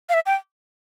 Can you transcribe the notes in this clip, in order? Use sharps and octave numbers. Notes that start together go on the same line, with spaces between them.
F5
E5
G5